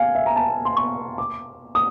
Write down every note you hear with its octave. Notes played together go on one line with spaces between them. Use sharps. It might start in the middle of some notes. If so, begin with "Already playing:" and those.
Already playing: F5 G#5
E5
A#5
A5
C6
C#6
D6
D#6